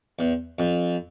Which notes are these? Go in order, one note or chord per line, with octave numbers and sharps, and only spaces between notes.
E2
F2